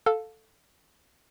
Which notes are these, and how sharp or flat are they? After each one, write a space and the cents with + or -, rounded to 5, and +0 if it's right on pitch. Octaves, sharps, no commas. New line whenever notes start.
A4 +0 F5 +15